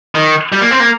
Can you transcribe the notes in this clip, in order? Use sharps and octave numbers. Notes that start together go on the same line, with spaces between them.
D#3
G3
A#3
C4
A#3